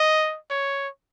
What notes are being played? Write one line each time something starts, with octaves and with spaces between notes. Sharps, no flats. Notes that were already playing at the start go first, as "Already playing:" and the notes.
Already playing: D#5
C#5